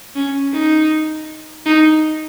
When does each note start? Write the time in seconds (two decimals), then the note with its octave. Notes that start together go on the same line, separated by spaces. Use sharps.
0.15 C#4
0.53 D#4
1.66 D#4